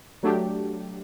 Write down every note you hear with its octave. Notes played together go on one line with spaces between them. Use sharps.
F#3 A3 D4 G4